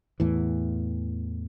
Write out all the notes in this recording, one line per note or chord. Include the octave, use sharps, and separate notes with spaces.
E2 A2 E3